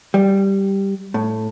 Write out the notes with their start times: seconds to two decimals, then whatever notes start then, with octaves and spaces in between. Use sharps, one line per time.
0.14 G3
1.14 A2